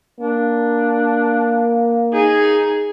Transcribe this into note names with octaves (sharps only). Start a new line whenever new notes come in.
A#3 D4
D#4 G#4